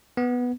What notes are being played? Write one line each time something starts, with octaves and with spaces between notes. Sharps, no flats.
B3